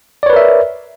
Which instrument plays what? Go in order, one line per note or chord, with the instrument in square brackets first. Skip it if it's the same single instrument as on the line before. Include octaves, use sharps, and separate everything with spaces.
[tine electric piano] D5
C#5
B4
A#4
E5